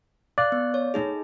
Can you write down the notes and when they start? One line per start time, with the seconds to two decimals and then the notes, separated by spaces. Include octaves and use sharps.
0.38 D5 F5 F#6
0.52 B3
0.74 C#5
0.94 A3 D#4 G#4